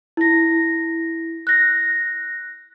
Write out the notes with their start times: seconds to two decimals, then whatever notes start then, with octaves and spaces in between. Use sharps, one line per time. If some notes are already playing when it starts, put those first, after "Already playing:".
0.17 E4 A#6
1.47 F#6 A#6